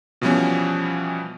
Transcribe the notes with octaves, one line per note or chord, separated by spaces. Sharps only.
B2 E3 F3 G3 B3 C#4